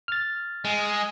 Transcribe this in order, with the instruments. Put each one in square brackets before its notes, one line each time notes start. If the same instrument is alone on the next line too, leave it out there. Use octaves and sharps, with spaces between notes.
[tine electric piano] F6 A6
[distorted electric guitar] G#3